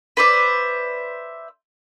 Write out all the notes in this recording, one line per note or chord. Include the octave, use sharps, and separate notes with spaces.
B4 C5 D5 E5